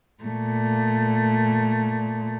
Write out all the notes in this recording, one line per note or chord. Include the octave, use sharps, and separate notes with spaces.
A#2 A3